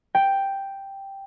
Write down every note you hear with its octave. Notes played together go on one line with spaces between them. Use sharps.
G5